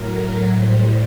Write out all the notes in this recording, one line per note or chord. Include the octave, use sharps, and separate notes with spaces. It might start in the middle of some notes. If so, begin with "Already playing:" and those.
Already playing: A2 F#3 A#4
A2 G3 C5